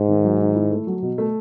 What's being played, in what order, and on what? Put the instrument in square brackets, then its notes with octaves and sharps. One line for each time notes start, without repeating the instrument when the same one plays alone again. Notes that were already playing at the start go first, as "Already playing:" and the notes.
Already playing: [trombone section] G#2
[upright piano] D#3
F#3
D#3
E4
A3
F#3
B2
A3